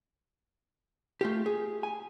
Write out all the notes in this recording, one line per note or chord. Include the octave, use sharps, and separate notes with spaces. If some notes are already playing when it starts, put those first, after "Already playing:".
A3 F4 G4
G#4
G#5